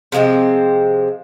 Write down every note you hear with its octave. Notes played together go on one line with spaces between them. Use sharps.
C3 F3 G#3 C4